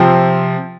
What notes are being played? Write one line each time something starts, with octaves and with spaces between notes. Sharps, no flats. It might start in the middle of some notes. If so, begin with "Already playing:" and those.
Already playing: C3 F3 C4